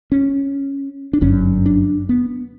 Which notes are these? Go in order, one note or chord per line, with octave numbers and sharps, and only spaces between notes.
C#4
D4
G1 F#2 D3 C#4
D4
B3